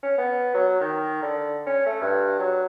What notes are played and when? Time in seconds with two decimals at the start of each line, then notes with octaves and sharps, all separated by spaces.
0.03 C#4
0.18 B3
0.54 F#3
0.81 D#3
1.22 D3
1.67 C#4
1.86 A3
2.02 G2
2.39 F#3